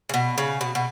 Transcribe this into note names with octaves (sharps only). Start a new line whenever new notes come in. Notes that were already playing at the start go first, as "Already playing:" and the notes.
C#3
B2
C#3
B2
B2